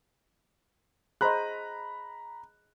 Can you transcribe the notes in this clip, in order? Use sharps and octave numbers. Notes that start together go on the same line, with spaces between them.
G#4 C5 D#5 A#5 B5 F#6